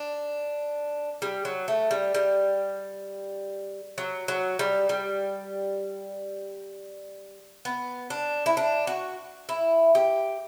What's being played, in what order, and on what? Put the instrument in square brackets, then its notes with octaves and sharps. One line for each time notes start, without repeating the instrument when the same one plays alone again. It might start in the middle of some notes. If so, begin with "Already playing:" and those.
Already playing: [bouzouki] D4
G3
F#3
A3
G3
G3
F#3
F#3
G3
G3
B3
D4
E4
D4
F#4
E4
G4